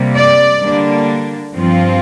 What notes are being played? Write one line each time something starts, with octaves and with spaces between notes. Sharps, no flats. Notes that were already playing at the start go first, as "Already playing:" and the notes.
Already playing: C3 G3 A#3
D5
D3 G3 A#3 D4
G2 F3 C4 F4